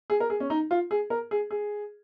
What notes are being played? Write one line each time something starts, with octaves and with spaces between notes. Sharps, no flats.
G#4
A#4
G#4
C#4
D#4
F4
G#4
A#4
G#4
G#4